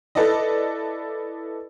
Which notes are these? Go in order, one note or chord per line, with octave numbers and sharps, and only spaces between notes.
E4 A4 B4 D5 D#5